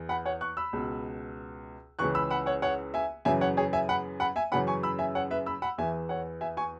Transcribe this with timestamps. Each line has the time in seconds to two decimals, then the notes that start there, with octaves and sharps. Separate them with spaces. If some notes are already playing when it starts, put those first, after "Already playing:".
Already playing: E2 E3
0.09 F#5 B5
0.25 C#5 F#5
0.41 C#6 F#6
0.57 B5 E6
0.73 C#2 B2
1.99 C#2 C#3 E3 C#6 F#6
2.15 B5 E6
2.30 F#5 B5
2.46 C#5 F#5
2.62 C#5 F#5
2.94 E5 G#5
3.25 F#2 C#3 E3 E5 G#5
3.41 C#5 F#5
3.57 G#4 C#5
3.73 E5 G#5
3.89 F#5 B5
4.20 F#5 B5
4.36 E5 G#5
4.52 F#2 C#3 E3 F#5 B5
4.67 G#5 C#6
4.83 B5 E6
4.99 E5 G#5
5.15 C#5 F#5
5.31 B4 E5
5.46 B5 E6
5.62 F#5 B5
5.78 E2 E3 E5 G#5
6.09 C#5 F#5
6.41 E5 G#5
6.57 G#5 C#6